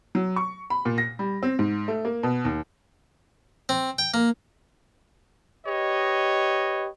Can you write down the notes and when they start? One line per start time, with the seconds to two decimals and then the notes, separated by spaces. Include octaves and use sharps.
0.15 F#3
0.36 C#6
0.70 B5
0.85 A#2
0.98 A#6
1.19 G3
1.43 C4
1.59 G#2
1.88 A3
2.05 A#3
2.23 B2
2.45 D#2
3.69 C4
3.98 G5
4.14 A#3
5.66 G4 B4 C#5 D#5